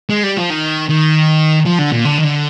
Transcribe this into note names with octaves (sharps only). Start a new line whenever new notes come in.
G#3
G3
F3
D#3
D#3
F3
D3
A#2
D3
D#3
D3